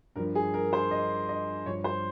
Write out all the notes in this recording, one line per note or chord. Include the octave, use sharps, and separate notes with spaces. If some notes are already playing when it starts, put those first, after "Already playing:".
G2 F3 A#4
G#4
A#4
C5
D#5
D#5
G2 F3 C#5
C5